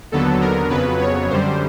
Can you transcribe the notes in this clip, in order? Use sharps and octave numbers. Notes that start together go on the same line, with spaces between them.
D#2 D3 F#3 B3 A4
A#4
F2 C#3 F#3 B3 B4
C#5
F#2 D3 G3 C5